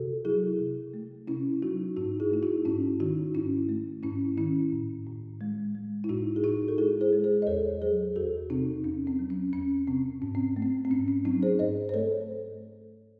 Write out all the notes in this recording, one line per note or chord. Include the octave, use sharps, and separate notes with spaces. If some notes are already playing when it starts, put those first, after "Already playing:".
Already playing: C3 F#4 A4
F#3 E4 G#4
C3
A3
C3 C#4 E4
F#3 D#4 F#4
G#2 D#4 F#4
E4 G#4
A3 E4
D#4 F#4
G#2 C#4 E4
D#3 D#4 F#4
G#2 C#4 E4
A3
G#2 C#4 E4
D#3 C#4 E4
A2
A2
G#3
G#3
E4
A2 D#4 F#4
G#4
A2 D#4 F#4
A4
G#3 E4 G#4
G#4 C5
G#3
G#4 C5
D#5
E2 A4 C#5
F#3 G#4 C5
E2 F#4 A4
C3 C4 D#4
E2 C#4
C4
F#3
C#4
E2 C#4
C3 C4
G#2 C#4
C4
A3
C4
C4
G#2 C#4
C#4
F#3 C4 D#4
G#4 C5
G#2 C5 D#5
C5
A3 A4 C#5